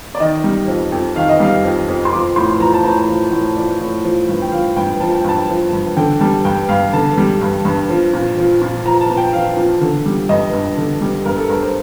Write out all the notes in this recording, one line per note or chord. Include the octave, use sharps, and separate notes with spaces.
D5
D#3 D#5
G3
F2
F2
D#3 F5
D#5
G3 F5
F2
F2
C6
F3 D6
A2 C6
F3 A#5
A5
A2 A#5
F3
A2
F3 D5
A2
F3
G2
G5
F3 F5
G2 G5
F3 A5
G5
G2 A5
F3
G2
D3 G5
G3 A5
G2 G5
G2 F5
D3 A5
G3
G2
G2
F3
A#2
F3
A#2
F3 A#5
A5
A#2
G5
F3 F5
A#2
D3
G3
G2 D#5
G2
D3
G3
G2 A#4
A4
G2 A#4
C5